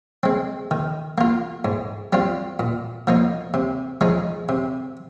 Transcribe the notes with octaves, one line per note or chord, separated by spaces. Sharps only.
G#3 C4
D#3
A#3 F4
G#2
G3 C4 F4
A#2
F3 A#3 D#4
C3
F3 G#3 D#4
C3